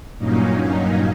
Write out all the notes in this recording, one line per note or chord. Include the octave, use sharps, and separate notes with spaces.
G2 A#2 F#3 A#3 C#4 D#4